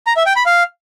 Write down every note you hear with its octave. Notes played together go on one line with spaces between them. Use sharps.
A#5
E5
G5
B5
F5